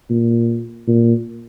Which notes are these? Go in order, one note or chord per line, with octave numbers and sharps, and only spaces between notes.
A#2
A#2